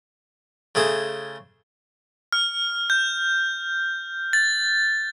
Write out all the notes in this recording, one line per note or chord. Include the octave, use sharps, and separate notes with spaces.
C#3 A3 G#4 C5
F6
G6
A6